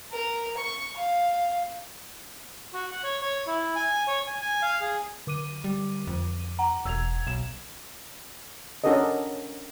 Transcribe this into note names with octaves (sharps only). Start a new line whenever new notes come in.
A#4
C#6
F5
F#4
F#5
C#5
C#5
E4
G#5
C#5
G#5
G#5
F5
G#4
D3 D6 D#7
G3
F2
F#5 A#5
E1 E6 G#6 F7
B1 E7
C#4 D4 F#4 A4 A#4 D#5